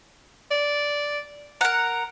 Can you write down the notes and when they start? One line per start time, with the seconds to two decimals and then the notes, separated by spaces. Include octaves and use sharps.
0.51 D5
1.61 A#4 F#5 A#5